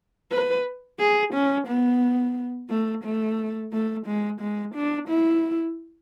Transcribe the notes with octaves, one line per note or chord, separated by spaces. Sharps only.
B4
G#4
C#4
B3
A3
A3
A3
G#3
G#3
D4
E4